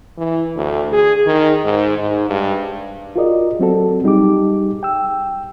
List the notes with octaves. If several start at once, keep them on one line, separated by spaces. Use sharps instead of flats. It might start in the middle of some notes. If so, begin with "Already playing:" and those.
E3
D2
G#4
D#3
G#2
G#2
G2
F4 F#4 G#4 A#4 D5 D#5
F#3 C4 F#4 A4
G3 D#4 G4 G#4 D6
G5 E6